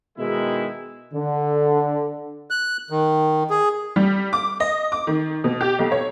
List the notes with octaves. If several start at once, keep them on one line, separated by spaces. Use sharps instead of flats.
B2 D#3 G#3 E4
D3
F#6
D#3
G#4
G3
D6
D#5
D6
D#3
B2
G4
B1
C#5